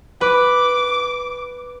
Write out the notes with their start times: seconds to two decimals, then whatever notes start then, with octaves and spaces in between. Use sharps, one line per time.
0.21 B4 D6